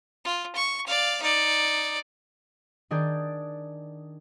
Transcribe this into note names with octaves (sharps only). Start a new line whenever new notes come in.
F4
C#6
D5 F5
D#4 D5
D#3 D4 G#4 D5 G6